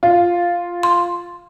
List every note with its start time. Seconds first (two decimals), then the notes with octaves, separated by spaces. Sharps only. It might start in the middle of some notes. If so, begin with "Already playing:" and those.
0.03 F4
0.83 C6